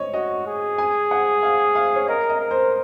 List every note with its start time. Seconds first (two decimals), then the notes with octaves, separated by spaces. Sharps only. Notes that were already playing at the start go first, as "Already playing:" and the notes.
Already playing: C#5 D#5
0.14 F#4 D#5
0.47 G#4
0.78 G#5
1.11 F#5
1.43 F5
1.75 F5
1.96 C#5
2.08 A#4 D#5
2.29 D#5
2.40 A#4
2.51 C5